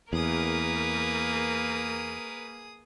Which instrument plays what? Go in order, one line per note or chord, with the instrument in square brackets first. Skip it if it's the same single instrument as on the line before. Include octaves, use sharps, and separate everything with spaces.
[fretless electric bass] E2 [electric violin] A#3 [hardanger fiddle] G#4 D#6 [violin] A#4 B4